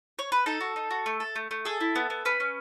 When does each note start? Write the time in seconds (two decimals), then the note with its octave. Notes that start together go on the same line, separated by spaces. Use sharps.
0.19 C#5
0.32 B4
0.46 D#4 A4
0.60 F#4
0.76 D#4
0.91 F#4
1.06 A3
1.20 A4
1.36 A3
1.51 A3
1.65 G#4 A4
1.81 E4
1.95 B3
2.10 B3
2.25 C#4 B4
2.40 C#4